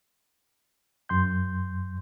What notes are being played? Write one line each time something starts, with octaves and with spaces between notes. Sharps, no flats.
F#2 C6 G6